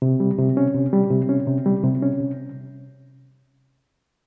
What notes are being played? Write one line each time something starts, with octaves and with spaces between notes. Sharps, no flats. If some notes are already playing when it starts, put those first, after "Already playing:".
C3
G3
C3
C#4
C3
G3
C3
C#4
C3
G3
C3
C#4
C3